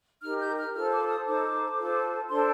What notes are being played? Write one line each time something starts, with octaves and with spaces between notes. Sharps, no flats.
D#4 G4 A#4 F6
G6
F6
F4 A4 C5 F6
D6
D#6
D#4 A4 C5 D6
F4 A4 C5
D4 A4 C5 C6